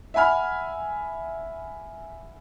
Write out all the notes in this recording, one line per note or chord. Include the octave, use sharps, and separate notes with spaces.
E5 F#5 G#5 B5 F6